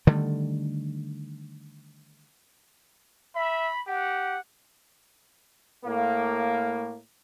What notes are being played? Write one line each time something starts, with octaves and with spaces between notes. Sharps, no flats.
D3 D#3 G3 A3
E5 B5
G4 F#5
A2 A#3 F5